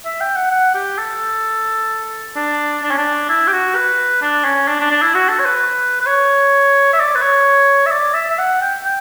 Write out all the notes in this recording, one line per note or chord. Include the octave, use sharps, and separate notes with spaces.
E5
G5
F#5
F#5
G4
A4
D4
D4
C#4
D4
E4
G4
F#4
B4
D4
C#4
D4
D4
D4
E4
F#4
A4
C#5
B4
B4
C#5
E5
D5
B4
C#5
E5
D5
E5
E5
F#5
G5
G5